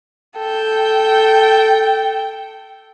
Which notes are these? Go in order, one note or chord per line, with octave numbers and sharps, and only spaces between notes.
A4 G5